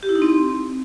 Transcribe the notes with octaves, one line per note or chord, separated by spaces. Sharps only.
G4
E4
D#4
C4